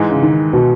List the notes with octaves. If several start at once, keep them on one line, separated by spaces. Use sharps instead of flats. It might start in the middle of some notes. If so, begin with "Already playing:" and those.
Already playing: G#2 E3 G#3
C#3
D#3
B2